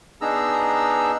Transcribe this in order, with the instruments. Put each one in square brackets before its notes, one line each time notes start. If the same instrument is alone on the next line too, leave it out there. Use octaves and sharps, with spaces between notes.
[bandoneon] B3 D4 D#4 G#4 A#5 E6